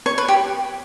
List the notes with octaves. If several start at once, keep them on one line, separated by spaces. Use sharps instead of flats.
C#5
B4
G4